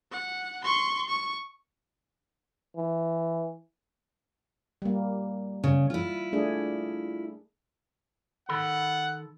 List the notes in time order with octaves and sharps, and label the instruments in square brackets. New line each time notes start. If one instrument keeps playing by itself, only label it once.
[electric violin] F#5
C6 C#6
C#6
[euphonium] E3
[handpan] G3 A#3
[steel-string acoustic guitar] C#3
E4 F4
[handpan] A3 D4 G#4
[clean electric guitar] D#3 A4 B5 [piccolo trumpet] F#5